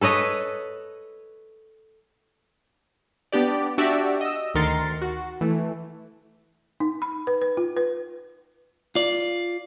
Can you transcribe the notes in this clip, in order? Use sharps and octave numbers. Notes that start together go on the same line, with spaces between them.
A4 B4 C#5 D#5
B3 D4 G4 D5
D4 F#4 G4 D5 E5
D#5 E6
D2 D#3 A#4 C6 A6 C#7
F#4
E3 A3
D#4
B5
B4
B4
F4
B4
F4 D5